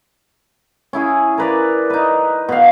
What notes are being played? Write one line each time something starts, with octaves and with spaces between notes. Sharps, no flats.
C#4 E4 G#4
A#4 B4 D5
D#4 B4
B2 F5